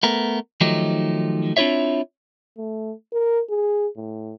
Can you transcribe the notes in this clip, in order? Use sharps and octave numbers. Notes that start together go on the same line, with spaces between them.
A3 B3 A#4
D#3 F3 F#3 A3 D#4 G4
C4 D4 E4 F4 C#5 E5
A3
A#4
G#4
A2